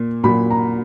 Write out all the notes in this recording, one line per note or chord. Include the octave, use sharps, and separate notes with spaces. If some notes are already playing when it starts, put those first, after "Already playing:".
Already playing: A#2 A#3
A#2 F#3 A#3 B5
A#5